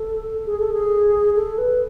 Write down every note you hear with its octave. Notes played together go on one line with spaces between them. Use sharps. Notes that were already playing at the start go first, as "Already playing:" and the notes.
Already playing: A4
G#4
A4
G#4
A4
B4